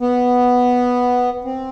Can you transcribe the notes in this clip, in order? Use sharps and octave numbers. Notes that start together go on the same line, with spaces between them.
B3
C4